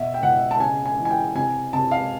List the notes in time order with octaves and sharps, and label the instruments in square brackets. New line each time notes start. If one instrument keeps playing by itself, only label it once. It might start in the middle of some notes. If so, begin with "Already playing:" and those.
Already playing: [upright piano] B2 E5
G5
B2 F#5
A5
C#3 G#5
G#5
E3
G#5
G5
C3 G#5
C3 A5
F5